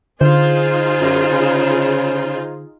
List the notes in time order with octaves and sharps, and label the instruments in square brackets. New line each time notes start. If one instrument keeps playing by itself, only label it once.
[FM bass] D3 [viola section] D#4 F4 G#4 [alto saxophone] C5
[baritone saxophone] F#2
C#3